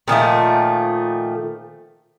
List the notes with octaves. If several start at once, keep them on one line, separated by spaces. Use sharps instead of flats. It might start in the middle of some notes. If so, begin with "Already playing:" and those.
A#2 D#3 F3 A3